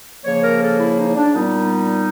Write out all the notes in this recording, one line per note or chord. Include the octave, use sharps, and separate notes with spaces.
C#3 F3 A#3 C#5
A#4
A4
E4
D#4
D4
A#2 G3 B3 D#4